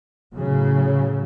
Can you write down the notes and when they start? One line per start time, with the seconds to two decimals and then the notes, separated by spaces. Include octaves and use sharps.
0.34 A2 C#3 F#3